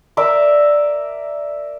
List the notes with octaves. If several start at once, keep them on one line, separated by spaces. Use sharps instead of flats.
A#4 D5 E5 A#5